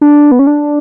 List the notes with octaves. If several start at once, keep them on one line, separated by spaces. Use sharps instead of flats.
D4
B3
C#4
D4